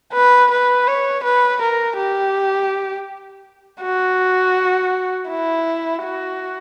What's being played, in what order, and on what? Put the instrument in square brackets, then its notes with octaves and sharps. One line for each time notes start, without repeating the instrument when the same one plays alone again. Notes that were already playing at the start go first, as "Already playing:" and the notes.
[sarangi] B4
B4
C#5
B4
A#4
G4
F#4
E4
F#4